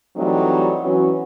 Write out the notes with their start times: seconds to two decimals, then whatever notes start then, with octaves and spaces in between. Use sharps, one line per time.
0.17 E3 F#3 G3 A3 C4 D#4
0.83 E3 F#3 B3 C#4 F#4